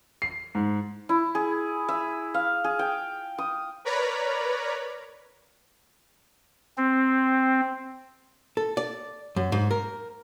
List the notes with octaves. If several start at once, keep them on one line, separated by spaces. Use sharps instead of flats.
C7
G#2
E4
G#4
E5
F5
G#4
G5
D#6
A#4 B4 C#5 D5 A#5 B5
C4
A4
D5
F#2
G#2
A#4